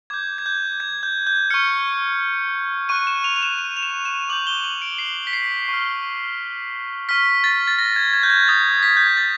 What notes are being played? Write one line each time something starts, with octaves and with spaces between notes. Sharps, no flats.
D6 G6 G#6
G#6
G6
G#6
G6
G6
C#6 F6 C#7
C#6 F#6 D#7
E7
F7
F7
E7
F7
F7
E7
E7
D6 G6 F#7
G7
F#7
D7
C7
B6
C7
C#6 F6
C#6 F6 B6
A6
A6
A#6
G#6
G#6
G6
G#6
D#6 G6 A6
B6
G6
G#6
A6